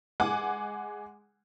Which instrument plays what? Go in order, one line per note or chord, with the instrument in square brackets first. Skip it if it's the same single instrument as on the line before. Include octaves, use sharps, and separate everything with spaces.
[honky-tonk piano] G#3 F#5 G#5 D6